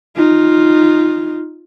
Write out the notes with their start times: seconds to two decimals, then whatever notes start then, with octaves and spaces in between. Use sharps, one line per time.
0.17 D#4 F4